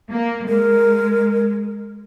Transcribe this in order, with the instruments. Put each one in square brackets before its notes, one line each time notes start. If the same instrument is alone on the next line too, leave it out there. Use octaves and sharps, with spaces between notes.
[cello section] A#3
[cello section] G#3 [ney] A#4